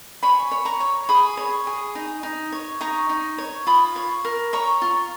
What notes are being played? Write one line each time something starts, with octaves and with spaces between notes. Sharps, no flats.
C#5 G#5 B5
C#5
A#5 C#6
C#5
G#4 B5 D#6
C#5
G#4
D#4
D#4
C#5
D#4 A#5 C#6
D#4
C#5
F4 B5 D#6
C#5
A#4
C#5 A#5 C#6
F4